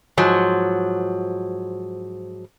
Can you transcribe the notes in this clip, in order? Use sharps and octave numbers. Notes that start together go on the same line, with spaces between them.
G#2 F3 F#3